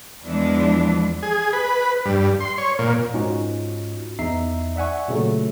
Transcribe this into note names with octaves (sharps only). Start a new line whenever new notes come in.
E2 E3 F3 G#3 D4
G#4
B4
G2
C6
C#5
A#2
G#2 C#4 D#4 F4 F#4
E2 D#4 E5 A#5 C7
D5 E5 F#5 G#5 C#6
A#2 C#3 F#3 A3